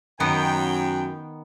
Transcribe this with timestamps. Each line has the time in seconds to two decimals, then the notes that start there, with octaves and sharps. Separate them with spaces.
0.20 F#2 D#3 B3 G5